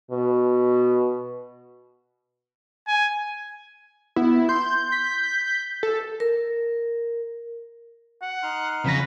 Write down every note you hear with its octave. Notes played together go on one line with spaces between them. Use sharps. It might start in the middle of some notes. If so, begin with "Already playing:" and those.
B2
G#5
B3 E4
C6 G6
B6
A4
A#4
F#5
D#4 C6 F6
F2 C#3 B4 A#6